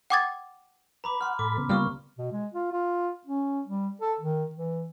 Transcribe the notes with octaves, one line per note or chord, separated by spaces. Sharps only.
F#5 G5 D6 D#6 G#6 A6
B4 A#5 B5 D6
F#5 C6 F6
A2 A4 B5 D6
C#3 B3
G3 A#3 F4 C#6 D#6 F6
B2
G#3
F4
F4
C#4
G3
A4
D#3
E3